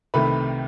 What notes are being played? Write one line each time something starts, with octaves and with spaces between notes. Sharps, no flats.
C2 C3 D#3 A3 B4 B5